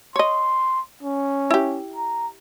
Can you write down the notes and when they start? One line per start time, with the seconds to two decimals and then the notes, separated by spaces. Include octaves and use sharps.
0.16 C#5 D#5 C6
1.03 C#4
1.51 E4 G4
1.96 A#5